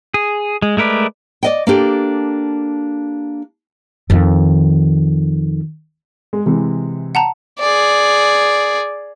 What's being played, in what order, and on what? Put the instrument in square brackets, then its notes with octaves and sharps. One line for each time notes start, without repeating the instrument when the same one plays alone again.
[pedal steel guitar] G#4
G#3
G#3 A3 A#4 B4 D5
[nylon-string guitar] D5 D#5 G5
A#3 D4 G4 A4
[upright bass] F2 D#3
[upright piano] G#3
C3 E3 G#3
[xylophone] F#5 A5 A#5
[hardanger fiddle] G#4 D5